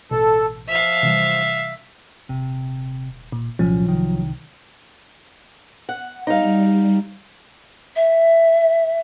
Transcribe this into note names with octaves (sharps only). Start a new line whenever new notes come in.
A1 B2 A4
F3 E5 F5
C3 E3 G3
D#1 C3
A#2
C2 A#2 F3 F#3 C#4
C2 D#3
F#5
G3 D#4 F5
E5